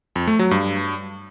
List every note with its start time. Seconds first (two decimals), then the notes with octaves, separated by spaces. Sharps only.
0.16 F2
0.27 A3
0.39 F#3
0.51 G2